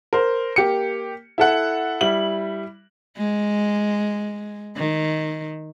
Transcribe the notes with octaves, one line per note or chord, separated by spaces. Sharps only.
A#4 C5
A#3 G4 C#7
E4 A4 F#5
G3 E4 F#7
G#3
D#3